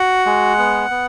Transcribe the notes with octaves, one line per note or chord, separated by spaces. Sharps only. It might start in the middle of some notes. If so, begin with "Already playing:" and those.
Already playing: F#4 F#5
G#3
B3
B3